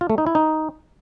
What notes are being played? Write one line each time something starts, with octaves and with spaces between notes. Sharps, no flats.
F4
A3
D#4
E4
D#4